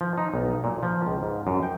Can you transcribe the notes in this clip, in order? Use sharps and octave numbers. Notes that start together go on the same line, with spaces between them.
F3
D#4
B1
A#2
F3
C#2
G#2
F#2
G5